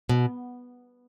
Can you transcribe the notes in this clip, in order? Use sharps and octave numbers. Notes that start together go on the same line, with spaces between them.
B2